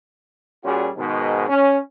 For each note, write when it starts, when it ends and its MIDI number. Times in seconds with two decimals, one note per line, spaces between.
0.64 0.89 46
0.64 0.89 55
0.64 0.89 61
0.64 0.89 65
0.64 0.89 66
0.64 0.89 68
0.96 1.48 44
0.96 1.48 47
0.96 1.48 51
1.48 1.78 61